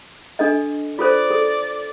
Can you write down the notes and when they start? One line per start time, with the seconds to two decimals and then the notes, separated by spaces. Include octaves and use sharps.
0.39 D4 A4 D#5
0.99 F4 A4 C5 D5
1.31 A4